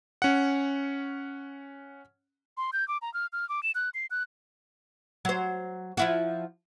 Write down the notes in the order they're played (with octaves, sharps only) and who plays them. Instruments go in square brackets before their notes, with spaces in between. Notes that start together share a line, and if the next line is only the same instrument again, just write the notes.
[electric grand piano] C#4 F#5
[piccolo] C6
G6
D6
A#5
F6
F6
D6
E7
F#6
C7
F#6
[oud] F#3 C5
F3 E4 F#4